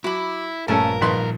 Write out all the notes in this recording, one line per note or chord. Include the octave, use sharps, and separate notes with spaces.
F#3 E4 B5 D6
A#1 G2 A3 C#4 A4 A#4 A5 A6
G#1 A#2 F3 B4 C6 B6